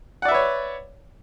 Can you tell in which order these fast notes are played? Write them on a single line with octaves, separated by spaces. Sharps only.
F#5 D5 E5 B4 C#5